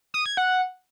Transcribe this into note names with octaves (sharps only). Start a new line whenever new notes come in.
D#6
G#6
F#5